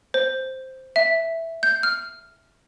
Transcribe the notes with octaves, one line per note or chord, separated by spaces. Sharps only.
C5
E5
G6
F6